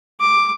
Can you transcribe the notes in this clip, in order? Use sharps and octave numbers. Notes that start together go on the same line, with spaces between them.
D6